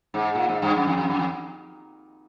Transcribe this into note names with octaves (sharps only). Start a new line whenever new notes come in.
G#2
A#2
G#2
G2
F#2
F2
F2
F#2
F2